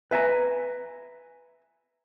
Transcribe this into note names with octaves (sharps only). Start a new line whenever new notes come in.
B4 E5 G#5 A#5